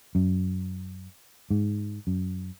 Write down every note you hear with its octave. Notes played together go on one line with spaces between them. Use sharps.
F#2
G#2
F#2